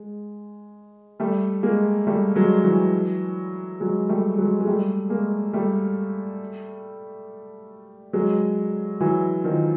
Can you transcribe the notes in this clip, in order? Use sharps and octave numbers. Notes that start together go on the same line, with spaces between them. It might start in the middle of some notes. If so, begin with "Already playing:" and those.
Already playing: G#3
G3 A3
G#3 A#3
G3 A3
F#3 G#3
E3 F#3
F#3 G#3
G3 A3
F#3 G#3
G#3
G3 A3
G#3 A#3
G3 A3
F#3 G#3
E3 F#3
D#3 F3